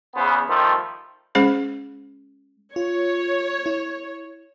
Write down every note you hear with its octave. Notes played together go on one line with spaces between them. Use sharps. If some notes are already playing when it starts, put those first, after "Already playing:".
E2 C#3 B3 C5
D#3 F3 G3 A3
G#3 C#4 G#4 C5
F4 C#5
E4